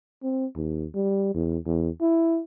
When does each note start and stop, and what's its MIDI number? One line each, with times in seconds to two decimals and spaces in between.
0.23 0.46 60
0.56 0.86 39
0.95 1.31 55
1.34 1.58 40
1.65 1.90 40
2.01 2.40 64